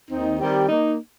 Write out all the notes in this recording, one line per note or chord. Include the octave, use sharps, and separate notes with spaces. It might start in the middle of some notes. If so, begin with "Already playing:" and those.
D#2 D#3 C4 D#4
D#3 G3 C4 G4
A#3 D#4